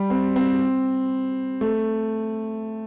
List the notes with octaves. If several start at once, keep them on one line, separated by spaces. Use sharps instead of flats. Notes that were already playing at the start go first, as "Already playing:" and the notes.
Already playing: G3
C4
C4
A3